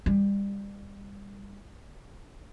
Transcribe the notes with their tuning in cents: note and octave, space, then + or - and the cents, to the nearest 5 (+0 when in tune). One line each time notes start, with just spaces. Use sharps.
G3 +30